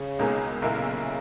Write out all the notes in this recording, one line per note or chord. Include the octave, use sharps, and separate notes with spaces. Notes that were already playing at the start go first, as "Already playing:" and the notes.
Already playing: C#3
C#2 B2 A#3 D#4 G#4
B1 A#2 C#3 A#3 E4 A#4